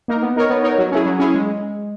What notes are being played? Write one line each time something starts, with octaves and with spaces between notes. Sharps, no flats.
A#3 D#4 A#4
B3
D#4 A#4 C#5
B3
D#4 A#4 C#5
F#3
C#4 E4 G#4
F#3
C#4 E4 G#4
G#3